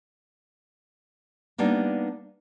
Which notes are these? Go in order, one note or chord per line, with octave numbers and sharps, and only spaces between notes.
G3 A#3 B3 D4 D#4